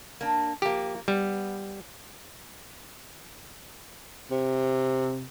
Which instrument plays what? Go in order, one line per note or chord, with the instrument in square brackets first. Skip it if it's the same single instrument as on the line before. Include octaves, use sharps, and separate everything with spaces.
[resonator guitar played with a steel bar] A#3 D4
[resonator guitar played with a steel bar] F3 A#3 [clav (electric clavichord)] G4
[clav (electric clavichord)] G3 [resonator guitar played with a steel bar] B3
[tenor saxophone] C3